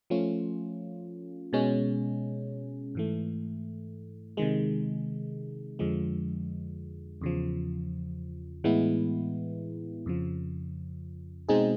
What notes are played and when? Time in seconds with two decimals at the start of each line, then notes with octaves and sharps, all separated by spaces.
0.10 F3 A3 C#4 F4
1.53 B2 G#3 C#4
2.95 G#2 E3 A3
4.37 C3 D#3 G#3
5.79 F2 D3 F3 G#3
7.21 E2 C#3 F3
8.64 A2 E3 G#3 B3 E4
10.06 F2 C#3 F3
11.48 B2 G#3 C4 D#4 G#4